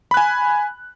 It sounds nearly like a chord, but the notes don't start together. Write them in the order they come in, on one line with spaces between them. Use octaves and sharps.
B5 F#6 G#5